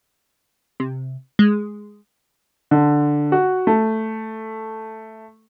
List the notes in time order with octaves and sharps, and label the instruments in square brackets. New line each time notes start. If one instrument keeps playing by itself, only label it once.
[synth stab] C3
G#3
[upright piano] D3
F#4
A3